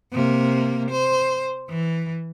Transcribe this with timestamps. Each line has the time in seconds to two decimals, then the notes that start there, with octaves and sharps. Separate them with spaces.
0.12 C3 A#3
0.91 C5
1.70 E3